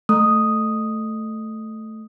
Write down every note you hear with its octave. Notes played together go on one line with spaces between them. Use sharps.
A3 D#6